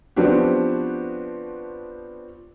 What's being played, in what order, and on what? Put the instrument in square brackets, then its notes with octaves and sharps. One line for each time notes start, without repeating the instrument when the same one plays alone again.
[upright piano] F3 B3 C4 D4 F#4 G4